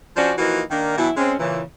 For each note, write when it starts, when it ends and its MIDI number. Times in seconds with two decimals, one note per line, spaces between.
0.16 0.33 53
0.16 0.33 61
0.16 0.33 62
0.16 0.33 66
0.16 0.33 72
0.16 0.33 74
0.38 0.61 52
0.38 0.61 53
0.38 0.61 58
0.38 0.61 63
0.38 0.61 65
0.38 0.61 66
0.71 0.94 51
0.71 0.94 58
0.71 0.94 62
0.98 1.10 47
0.98 1.10 52
0.98 1.10 54
0.98 1.10 64
1.17 1.33 56
1.17 1.33 60
1.17 1.33 61
1.39 1.61 46
1.39 1.61 49
1.39 1.61 52